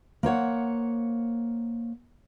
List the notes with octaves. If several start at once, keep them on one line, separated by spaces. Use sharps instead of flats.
A#3 C5 C#5 F#5